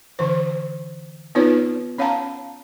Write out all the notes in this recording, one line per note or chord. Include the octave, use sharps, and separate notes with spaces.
D3 E3 C5
B3 C4 D#4 F4 B4 C#5
C#4 C#5 F5 F#5 A5 A#5